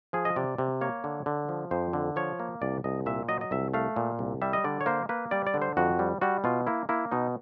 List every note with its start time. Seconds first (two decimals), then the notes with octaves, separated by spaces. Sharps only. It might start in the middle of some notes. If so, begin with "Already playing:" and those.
0.13 F3 G#4
0.25 D#5
0.36 C3 D5
0.58 C3
0.81 A#3 C#5
1.04 D3
1.26 D3
1.49 F3
1.71 F2 C5
1.93 D3
2.16 F3 C#5
2.39 A#3
2.62 C2 D5
2.84 C2 D#5
3.06 A#2 E5
3.29 F#3 D#5
3.41 D#5
3.51 C2 E5
3.74 A3 F5
3.96 A#2
4.19 C2
4.42 G3 E5
4.53 D#5
4.64 D3 D5
4.81 C#5
4.86 A#3 C5
5.09 A#3 B4
5.31 G3 D5
5.47 D5
5.54 D3
5.62 C5
5.77 F2 F#4
5.99 G3
6.21 G3 F#4
6.44 B2 F4
6.67 A#3 E4
6.89 A#3 E4
7.11 B2 D#4